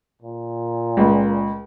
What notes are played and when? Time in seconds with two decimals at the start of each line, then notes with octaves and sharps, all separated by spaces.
0.22 A#2
0.97 C#2